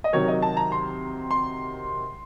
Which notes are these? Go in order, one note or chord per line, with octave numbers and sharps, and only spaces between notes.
D#5
C3 D#3 F#3 C#5
D#5
A5
A#5
C6
C6